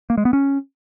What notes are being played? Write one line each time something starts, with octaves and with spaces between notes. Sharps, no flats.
A#3
G#3
B3
C#4